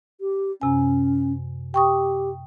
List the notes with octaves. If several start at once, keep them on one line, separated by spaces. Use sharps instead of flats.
G4
F#2 C3 C#4 G#5
G4 G5 C#6 D#6